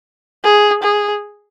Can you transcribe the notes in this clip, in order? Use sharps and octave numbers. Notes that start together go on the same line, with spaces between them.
G#4
G#4